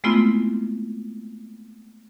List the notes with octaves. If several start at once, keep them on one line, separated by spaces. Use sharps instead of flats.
G#3 A3 B3 C4 E4 F4